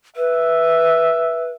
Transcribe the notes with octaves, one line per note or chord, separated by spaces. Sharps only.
B4 E5